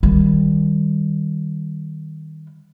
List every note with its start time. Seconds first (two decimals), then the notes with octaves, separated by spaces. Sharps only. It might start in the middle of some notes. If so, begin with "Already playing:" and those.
0.03 D#3 G3